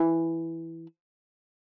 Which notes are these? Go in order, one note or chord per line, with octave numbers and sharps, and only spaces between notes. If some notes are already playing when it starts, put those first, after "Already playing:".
Already playing: E3